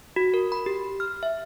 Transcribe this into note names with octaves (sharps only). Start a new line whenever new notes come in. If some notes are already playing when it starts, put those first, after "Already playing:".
F#4
A#4
B5
G4
F6
E5